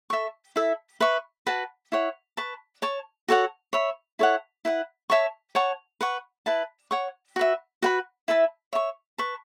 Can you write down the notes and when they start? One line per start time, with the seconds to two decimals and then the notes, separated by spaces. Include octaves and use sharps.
0.10 A4 E5 C#6
0.56 E4 A4 E5
1.00 B4 E5 C#6
1.47 F#4 B4 F#5 A5
1.92 E4 C#5 F#5
2.37 B4 A5 C#6
2.82 C#5 A5 C#6
3.28 F#4 A4 C#5 F#5
3.73 C#5 E5 B5
4.19 E4 A4 C#5 F#5
4.65 E4 B4 F#5
5.10 C#5 E5 A5 C#6
5.55 C#5 F#5 A5 C#6
6.01 B4 F#5 C#6
6.46 E4 B4 A5
6.91 C#5 F#5 C#6
7.36 F#4 B4 E5
7.82 F#4 B4 F#5 B5
8.28 E4 B4 E5 A5
8.73 C#5 E5 A5 C#6
9.18 B4 A5 C#6